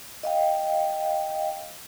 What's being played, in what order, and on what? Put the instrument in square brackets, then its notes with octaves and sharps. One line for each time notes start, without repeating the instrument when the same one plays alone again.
[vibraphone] D#5 F5 G5